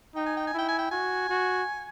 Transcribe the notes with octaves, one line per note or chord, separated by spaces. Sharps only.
D#4 G5
G#5
G5
G#5
E4 G5
G#5
G5
F#4 G#5
F#4